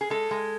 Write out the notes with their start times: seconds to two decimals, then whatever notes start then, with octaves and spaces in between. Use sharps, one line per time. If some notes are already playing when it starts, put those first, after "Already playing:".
0.01 G#4
0.10 G#3 A4
0.31 G#3